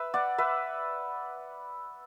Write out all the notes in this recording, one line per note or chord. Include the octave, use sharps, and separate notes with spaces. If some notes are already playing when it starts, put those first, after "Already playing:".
Already playing: B4 E5
D5 F#5
B4 E5